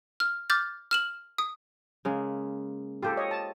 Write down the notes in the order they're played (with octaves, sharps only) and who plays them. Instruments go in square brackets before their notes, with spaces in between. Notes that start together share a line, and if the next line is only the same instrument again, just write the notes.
[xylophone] F6
D6 F6 G6 A6
F6 E7 F#7
D#6
[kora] C#3 G#3 A#3
[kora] F4 C5 [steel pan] G4 A4
[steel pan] C#5 D#5
A5